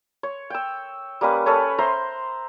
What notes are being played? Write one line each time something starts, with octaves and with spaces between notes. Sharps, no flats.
C#5
G5 E6
G3 A#3 C#4 B4
C#4 A4 B4 C#5
C5 E5 A#5 C6